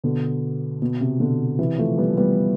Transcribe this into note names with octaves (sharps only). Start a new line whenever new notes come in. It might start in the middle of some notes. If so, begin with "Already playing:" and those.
B2 D3
B2
C3
B2 D3
C3 E3
F3 A3
G3 B3
G3 B3